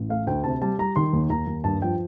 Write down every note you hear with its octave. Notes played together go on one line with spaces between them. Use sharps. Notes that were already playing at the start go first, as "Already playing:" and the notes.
Already playing: A1
A3 F5
D2 G5
C3 A5
G3 A5
G3 A#5
D#3 C6
D#2
D#2 A#5
D#2
G2 A5
F3 G5